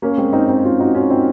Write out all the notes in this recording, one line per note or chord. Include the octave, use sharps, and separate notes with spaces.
A#3 C#4
G#3 C4
C4 D#4
C4 D#4
C#4 F4
D#4 F#4
C#4 F4
C4 D#4